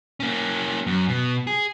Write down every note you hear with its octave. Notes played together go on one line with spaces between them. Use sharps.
A#3 C#4
F#2
B2
G#4